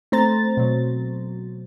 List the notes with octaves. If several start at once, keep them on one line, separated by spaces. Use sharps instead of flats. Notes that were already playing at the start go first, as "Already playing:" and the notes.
A3 C4 C5 A#5 A6
B2 F#3